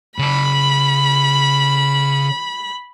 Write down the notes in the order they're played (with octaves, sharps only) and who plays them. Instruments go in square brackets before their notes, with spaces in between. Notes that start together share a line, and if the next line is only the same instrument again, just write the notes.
[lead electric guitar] C#3 A5 [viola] B5